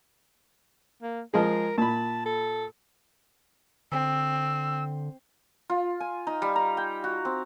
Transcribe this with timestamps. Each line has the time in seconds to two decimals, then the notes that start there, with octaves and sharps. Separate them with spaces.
1.02 A#3
1.34 F3 G#3 G#4 A#4
1.78 A#2 A5 B5
2.25 A4
3.92 D3 C4 E6
5.70 F4
6.00 G#5
6.27 D#4
6.42 G3
6.56 A#5
6.77 G5
7.04 F#4
7.25 C4